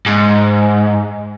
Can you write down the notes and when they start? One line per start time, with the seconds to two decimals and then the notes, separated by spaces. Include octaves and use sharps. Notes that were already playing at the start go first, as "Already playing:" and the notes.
0.07 G#2